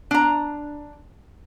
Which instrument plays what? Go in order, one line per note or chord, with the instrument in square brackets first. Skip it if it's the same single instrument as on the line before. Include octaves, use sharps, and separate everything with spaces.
[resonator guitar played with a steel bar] D4 A#5